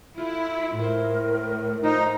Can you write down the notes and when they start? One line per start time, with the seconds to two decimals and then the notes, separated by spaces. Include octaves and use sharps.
0.18 A3 E4 F4
0.79 A2 E4 A#4 C5
1.84 F3 D#4 C5